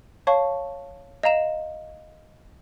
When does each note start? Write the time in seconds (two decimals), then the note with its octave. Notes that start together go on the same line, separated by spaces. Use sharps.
0.27 C#5 F5 A5 C#6
1.23 D#5 F5 A#5 E7